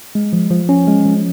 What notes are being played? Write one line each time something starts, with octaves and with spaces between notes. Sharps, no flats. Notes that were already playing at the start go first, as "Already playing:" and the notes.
G#3
F3
F3
C#4
G#3
F3